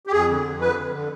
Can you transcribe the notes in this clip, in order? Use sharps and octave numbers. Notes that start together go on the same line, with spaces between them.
G4
F2 G#4
D3
F2
D3 B4
F2
D3